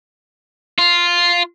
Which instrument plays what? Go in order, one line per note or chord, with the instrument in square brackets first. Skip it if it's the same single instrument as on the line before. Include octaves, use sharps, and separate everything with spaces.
[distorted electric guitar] F4